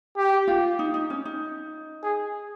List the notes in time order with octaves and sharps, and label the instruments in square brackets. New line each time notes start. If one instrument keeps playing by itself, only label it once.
[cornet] G4
[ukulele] F4
D#4
D#4
C#4
D#4
[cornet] G#4